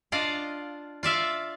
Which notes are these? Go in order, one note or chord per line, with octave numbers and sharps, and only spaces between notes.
D4 F4 D5 D#5 F5
F4 D5 E5 F5